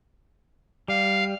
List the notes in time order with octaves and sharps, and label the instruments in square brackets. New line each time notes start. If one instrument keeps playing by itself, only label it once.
[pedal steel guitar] G3 [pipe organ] F5